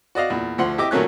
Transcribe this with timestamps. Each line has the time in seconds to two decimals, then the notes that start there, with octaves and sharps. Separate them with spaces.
0.15 F#4 D5 D#5 F5
0.30 E2 A#2
0.58 D2 F3 F#5 C6
0.78 E4 G4 D#5 D6
0.91 A#2 D#3 F#3 A3 C#4 F#6